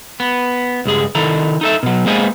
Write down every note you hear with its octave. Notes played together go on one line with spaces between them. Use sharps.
B3
C#2 G2 G#4
D#3 E4 A4 A#5
D#4 A4 E5
B2 F#3
G#3 A#3 B3 G#4 C5 G#5